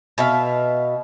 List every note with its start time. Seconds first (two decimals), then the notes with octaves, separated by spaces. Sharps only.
0.18 B2 E5 F5